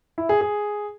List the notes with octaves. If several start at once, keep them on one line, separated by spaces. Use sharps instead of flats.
E4
G#4
G#4